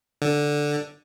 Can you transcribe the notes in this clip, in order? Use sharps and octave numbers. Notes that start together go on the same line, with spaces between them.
D3